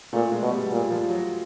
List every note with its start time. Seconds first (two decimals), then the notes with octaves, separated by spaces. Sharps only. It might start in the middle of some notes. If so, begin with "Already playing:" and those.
0.13 A#2 A3
0.32 G#3
0.42 B2
0.51 G3
0.71 A#2
0.90 F3
1.09 F#3